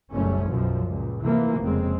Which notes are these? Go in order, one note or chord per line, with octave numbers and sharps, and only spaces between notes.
F#1 B1 G3 A3 C#4
B1 F#2 B2 F3
C#2 A#2
C3 E3 F3 A3 A#3
F1 F2 C#3 G#3 C4